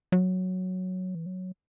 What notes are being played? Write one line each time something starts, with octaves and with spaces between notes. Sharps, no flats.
F#3
E3
F#3